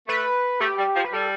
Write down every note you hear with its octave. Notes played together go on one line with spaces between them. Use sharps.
A3 B4
A3 G4
G3
F3
B4
G3 A4